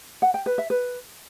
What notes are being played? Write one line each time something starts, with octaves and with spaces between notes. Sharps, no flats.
F#5
G5
B4
E5
B4